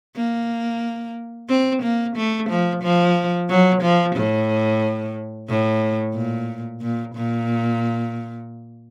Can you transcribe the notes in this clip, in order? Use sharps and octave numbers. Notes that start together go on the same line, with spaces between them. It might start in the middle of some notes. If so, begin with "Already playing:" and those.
A#3
C4
A#3
A3
F3
F3
F#3
F3
A2
A2
A#2
A#2
A#2